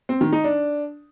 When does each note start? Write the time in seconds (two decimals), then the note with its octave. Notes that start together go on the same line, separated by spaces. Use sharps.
0.09 C4
0.21 D#3
0.32 D#4
0.44 D4